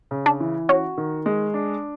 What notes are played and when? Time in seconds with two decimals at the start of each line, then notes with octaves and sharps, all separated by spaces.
0.11 C#3
0.26 D4
0.40 E3
0.69 C#4 F#4
0.97 D#3
1.26 G#3
1.54 D4